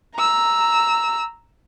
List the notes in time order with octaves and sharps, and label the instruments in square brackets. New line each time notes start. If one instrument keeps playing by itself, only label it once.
[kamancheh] A#5 E6